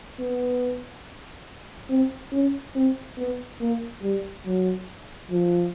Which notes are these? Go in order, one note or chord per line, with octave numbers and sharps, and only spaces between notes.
B3
C4
C#4
C4
B3
A#3
G3
F#3
F3